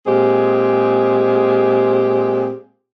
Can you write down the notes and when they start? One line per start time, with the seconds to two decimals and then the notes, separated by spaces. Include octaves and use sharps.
0.06 A#2 G#3 C4 G4 G#4